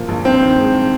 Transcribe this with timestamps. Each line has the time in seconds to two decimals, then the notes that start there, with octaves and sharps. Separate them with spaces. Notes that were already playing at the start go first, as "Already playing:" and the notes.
Already playing: A#2 F3 A#3
0.08 A#1
0.25 G2 C4
0.41 D#3
0.57 G#3